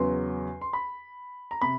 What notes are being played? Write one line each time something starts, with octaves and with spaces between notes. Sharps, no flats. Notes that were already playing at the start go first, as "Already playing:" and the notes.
Already playing: E2 C#3 F#3 B3 C6
C6
B5
A#5
C3 B5